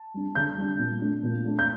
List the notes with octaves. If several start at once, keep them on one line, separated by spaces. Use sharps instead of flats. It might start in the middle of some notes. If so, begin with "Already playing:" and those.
Already playing: A5
G3 D4
D3 G6
G3 D4
A#2
A3 D4
A#2
A3 D4
G6